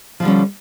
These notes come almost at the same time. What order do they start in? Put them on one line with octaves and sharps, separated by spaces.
F3 D3 G3 C#4